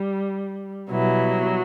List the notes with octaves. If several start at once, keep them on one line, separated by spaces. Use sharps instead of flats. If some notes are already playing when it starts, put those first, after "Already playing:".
Already playing: G3
B2 F#3 G3 B3 E4